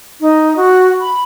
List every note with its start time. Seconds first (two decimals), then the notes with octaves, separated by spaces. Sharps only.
0.20 D#4
0.56 F#4
1.01 B5